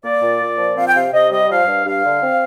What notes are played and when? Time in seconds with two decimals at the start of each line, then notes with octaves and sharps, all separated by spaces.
0.04 A#3 D5
0.22 A#2
0.40 A#2
0.58 F3
0.76 C4 F5
0.87 G5
0.94 C3 F5
1.13 C3 D#5
1.31 G3 D#5
1.50 F3 F5
1.67 G2
1.86 G2 F5
2.05 D3
2.22 C4